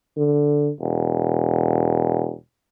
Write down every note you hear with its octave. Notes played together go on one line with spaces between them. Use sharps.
D3
E1